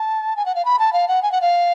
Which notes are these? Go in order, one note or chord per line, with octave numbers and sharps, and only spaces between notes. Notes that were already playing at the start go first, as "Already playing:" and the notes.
Already playing: A5
G#5
F#5
F5
B5
A5
F5
F#5
G#5
F#5
F5